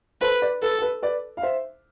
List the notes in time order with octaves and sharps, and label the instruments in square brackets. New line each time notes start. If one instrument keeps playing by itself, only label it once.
[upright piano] A4 C5 [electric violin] B4
[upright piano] B4 D5
[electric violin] A4 [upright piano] B4
[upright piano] A4
B4
B4 D5
F5
C5 E5